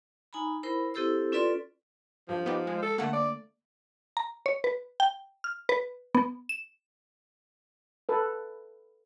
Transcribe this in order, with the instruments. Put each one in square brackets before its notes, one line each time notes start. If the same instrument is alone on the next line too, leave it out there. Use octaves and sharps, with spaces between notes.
[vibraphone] D#4 G#5 A#5 B5
E4 A#4 C5 B5
C4 E4 G4 A4 C5 E6
C#4 F4 A4 B4 D5 C6
[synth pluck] G2 [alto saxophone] F3
[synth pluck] B3 D#4 G4
G#3
[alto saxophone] A4
[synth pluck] D3 A3 A#3 [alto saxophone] F#5
[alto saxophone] D5
[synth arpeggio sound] A#5
C#5
B4
G5
F6
B4
B3
E7
[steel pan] A4 B4